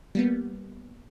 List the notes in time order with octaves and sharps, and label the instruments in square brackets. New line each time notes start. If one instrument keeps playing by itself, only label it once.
[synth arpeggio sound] G3 A#3 B3